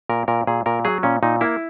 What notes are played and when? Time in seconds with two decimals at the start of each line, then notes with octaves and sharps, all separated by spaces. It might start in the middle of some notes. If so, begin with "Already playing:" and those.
0.09 A#2 A#4
0.28 A#2 A#4
0.47 A#2 G#4
0.66 A#2 A#4
0.85 F#3 G#4
1.03 A#2 C#4
1.23 A#2 D#4
1.41 A#3 E4